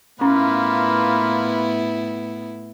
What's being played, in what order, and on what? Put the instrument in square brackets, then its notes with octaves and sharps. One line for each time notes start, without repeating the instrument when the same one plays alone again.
[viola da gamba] A2 B3 E4 [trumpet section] A#3 F4 B4 [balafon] C#4